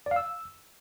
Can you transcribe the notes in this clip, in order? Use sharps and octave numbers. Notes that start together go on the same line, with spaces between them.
D5
F5
E6